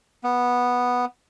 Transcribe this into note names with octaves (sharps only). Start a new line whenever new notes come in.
B3